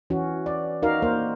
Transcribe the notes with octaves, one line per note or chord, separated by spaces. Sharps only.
E3 C#4 F#4
D5
D#4 F#4 A#4 D5 F5
A#3 A#4 C5